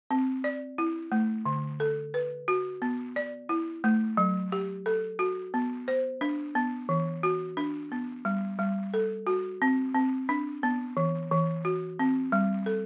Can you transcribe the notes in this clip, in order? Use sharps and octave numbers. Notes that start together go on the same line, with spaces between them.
C4
D5
E4
A3
D3
A4
B4
F#4
B3
D5
E4
A3
F#3
G4
A4
F#4
B3
C5
D4
B3
E3
F#4
D4
B3
G3
G3
A4
F#4
C4
C4
D4
B3
E3
E3
F#4
C4
G3
A4